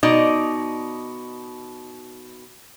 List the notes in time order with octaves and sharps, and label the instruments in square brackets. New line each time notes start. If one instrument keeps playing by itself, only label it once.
[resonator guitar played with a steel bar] B2 D#4 D5